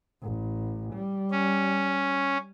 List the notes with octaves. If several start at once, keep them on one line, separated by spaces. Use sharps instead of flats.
A1
G3
C#4